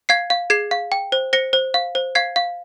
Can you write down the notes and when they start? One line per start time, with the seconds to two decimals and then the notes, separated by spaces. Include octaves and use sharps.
0.09 F5 G#6 C7
0.30 F5
0.50 G#4 G#6 C7
0.71 F5
0.92 G5
1.12 C5
1.33 C5 A#6 C#7
1.53 C5
1.74 F5
1.95 C5
2.15 F5 G#6 C7
2.36 F5